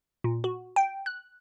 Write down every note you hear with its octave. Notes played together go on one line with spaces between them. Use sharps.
A#2
F#4
G5
F#6